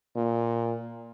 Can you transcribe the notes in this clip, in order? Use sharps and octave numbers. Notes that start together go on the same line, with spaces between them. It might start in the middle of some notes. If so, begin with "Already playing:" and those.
A#2